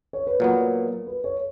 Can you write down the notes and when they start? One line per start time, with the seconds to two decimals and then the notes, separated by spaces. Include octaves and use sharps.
0.13 C#5
0.27 B4
0.40 A#2 F#3 B3 A#4
1.07 B4
1.24 C#5